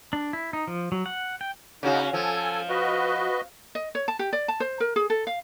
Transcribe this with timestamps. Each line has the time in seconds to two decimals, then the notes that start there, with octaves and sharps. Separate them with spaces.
0.13 D4
0.33 E4
0.53 D#4
0.67 F3
0.92 F#3
1.06 F#5
1.41 G5
1.83 C#3 C#4 D#4 F#4
2.13 F3 A4 G#5
2.69 F#4 B4 D#5
3.75 D#5
3.95 C#5
4.08 A5
4.19 G4
4.33 D5
4.48 A5
4.60 C5
4.80 A#4
4.96 G#4
5.10 A4
5.27 F5